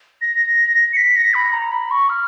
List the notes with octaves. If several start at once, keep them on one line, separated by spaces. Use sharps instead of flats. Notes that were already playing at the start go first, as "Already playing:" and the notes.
A#6
C#7
B6
A#6
B5
A#5
B5
C#6
F6